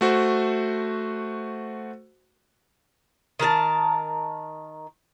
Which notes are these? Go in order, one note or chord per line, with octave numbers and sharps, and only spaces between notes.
A3 F#4 C5
D#3 A#4 B4 A5